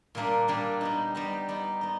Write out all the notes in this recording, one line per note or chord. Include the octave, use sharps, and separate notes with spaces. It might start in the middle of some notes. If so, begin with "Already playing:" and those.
A#2 G3 A#3 D4
A#2 G3 A#3 D4
G3 B3 D#4
G3 B3 D#4
G3 B3 D#4
B3 D#4